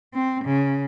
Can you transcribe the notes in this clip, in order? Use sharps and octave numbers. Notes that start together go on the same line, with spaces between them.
C4
C#3